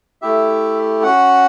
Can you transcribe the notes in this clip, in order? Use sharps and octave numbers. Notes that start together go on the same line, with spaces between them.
A3 E4 G4 E5
C#4 F#4 F#5